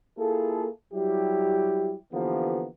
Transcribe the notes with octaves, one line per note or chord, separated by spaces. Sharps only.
A#3 E4 F4 G#4 A4
F#3 G3 E4 G4
D3 E3 F3 A#3 B3 G4